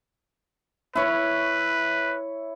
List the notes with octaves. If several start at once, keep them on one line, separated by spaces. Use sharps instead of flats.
E4 B4 C#5